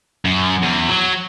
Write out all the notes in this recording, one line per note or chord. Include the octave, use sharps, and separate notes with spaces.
F#2
E2
F#3